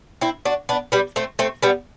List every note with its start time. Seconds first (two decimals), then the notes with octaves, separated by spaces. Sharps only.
0.21 C4 E4
0.45 D4 F#4
0.69 B3 D4
0.92 G3 B3
1.16 A3 C4
1.39 A3 C4
1.62 G3 B3